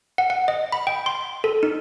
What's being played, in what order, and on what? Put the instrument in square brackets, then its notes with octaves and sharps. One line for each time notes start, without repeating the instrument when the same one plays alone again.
[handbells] F#5
F#5
D#5
B5
G5
C6
A4
D#4